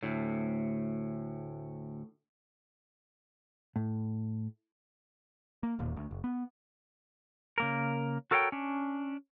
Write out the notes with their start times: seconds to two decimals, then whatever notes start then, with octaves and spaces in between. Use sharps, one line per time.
0.03 D2 A2
3.76 A2
5.63 A#3
5.79 E1 D#2 A#2
5.96 D2
6.11 F#1
6.24 B3
7.58 C#3 A#3 A#4
8.31 F#4 A4 A#4 C#5 F5 G5
8.52 C#4 D4